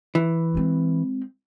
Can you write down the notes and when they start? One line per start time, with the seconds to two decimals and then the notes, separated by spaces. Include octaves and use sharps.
0.15 E3
0.55 G#3 C4